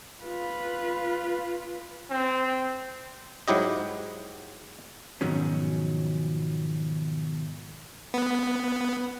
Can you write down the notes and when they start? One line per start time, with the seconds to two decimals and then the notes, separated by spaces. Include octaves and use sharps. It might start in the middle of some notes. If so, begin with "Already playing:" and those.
0.24 F4 B4
2.11 C4
3.48 G#2 F#3 E4 G4 D#5
5.21 G#2 B2 D#3 F3 F#3 C#4
8.14 B3